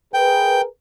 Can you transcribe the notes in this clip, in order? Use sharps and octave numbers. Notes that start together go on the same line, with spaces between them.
G#4 A#4 B4 G5